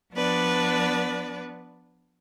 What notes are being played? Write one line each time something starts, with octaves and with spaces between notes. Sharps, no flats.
F3 B3 D4 B4 D5